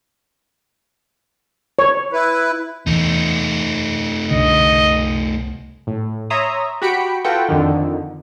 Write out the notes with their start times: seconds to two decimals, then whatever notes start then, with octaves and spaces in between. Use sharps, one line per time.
1.79 C#5
2.13 E4 B4
2.87 E2 A3 D#4
4.31 C2 B2 D3 D#5
5.87 A2
6.30 C#5 E5 A#5 C6 D#6
6.82 F#4 G4 B5 B6 C#7 D7
7.24 F4 F#4 A4 B4 F#5 G5
7.49 F2 D3 D#3